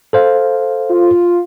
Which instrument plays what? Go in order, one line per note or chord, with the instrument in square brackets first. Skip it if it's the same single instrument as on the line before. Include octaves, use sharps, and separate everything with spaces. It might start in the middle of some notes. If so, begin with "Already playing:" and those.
[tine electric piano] A4 C5 F5
[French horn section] F4